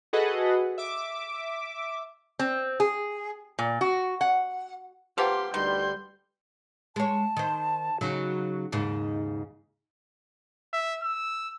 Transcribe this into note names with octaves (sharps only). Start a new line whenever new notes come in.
F#4 G#4 A4 B4 D#5 F#5
E5 D6
C4
G#4
A#2
F#4
F#5
F3 A#3 F4 G4 B4 F#5 G5 C6
D2 D#3 G3 C6 G6
G#3 C#5 A5
D#3 C5
C#3 F#3 D#4 F#4
D#2 G#2 C#3 D#4
E5
E6